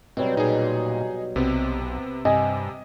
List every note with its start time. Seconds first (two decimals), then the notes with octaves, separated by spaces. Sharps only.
0.17 B2 F#3 G3 C4
0.37 A#2 D#4 G#4
1.36 B1 C3 B3 C4
2.25 G2 C3 D#5 G#5